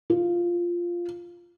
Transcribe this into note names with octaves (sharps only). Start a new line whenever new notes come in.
F4